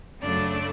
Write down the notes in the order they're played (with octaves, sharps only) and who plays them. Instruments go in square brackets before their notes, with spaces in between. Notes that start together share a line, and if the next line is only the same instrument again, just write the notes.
[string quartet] F#2 C#3 F#3 A3 D4 D5